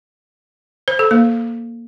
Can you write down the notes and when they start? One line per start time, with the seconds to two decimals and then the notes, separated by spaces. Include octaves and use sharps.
0.88 C5
0.99 A4
1.11 A#3